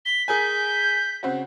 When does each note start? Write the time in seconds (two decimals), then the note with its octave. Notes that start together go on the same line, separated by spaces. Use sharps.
0.06 B6 G7
0.28 G#4 A#4 G#5 G6
1.23 C#3 C4 F#4